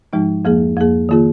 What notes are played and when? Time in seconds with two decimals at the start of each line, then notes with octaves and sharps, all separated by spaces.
0.13 G#2 F3 G#3 D#4
0.45 F2 F3 A#3 G#4
0.76 F2 F3 A#3 G#4
1.09 D#3 A#3 F4 G#4